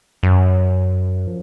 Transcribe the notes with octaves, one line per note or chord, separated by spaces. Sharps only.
F#2
F3